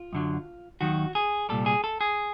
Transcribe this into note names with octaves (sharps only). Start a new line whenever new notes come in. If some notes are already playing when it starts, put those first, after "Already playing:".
Already playing: F4
F#2 D3 F#3
D#2 D#3 F#3 F#4
G#4
C2 A#2 G3 A4
G#4
A4
G#4